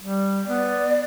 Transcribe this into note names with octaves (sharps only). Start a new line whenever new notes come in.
G3
B3 D5